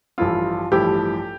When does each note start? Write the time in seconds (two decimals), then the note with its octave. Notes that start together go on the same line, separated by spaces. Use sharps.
0.18 A1 G2 F3 A3 E4 F4
0.72 A1 G2 F3 A3 E4 G4